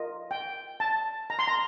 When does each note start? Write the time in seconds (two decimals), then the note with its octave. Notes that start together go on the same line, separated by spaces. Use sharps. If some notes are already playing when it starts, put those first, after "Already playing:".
Already playing: F4 A#4 D#5
0.31 G5
0.80 A5
1.30 A#5
1.39 C6
1.48 A#5